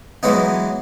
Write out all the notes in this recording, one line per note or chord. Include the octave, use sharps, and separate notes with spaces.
E3 F#3 G#3 B3 D#4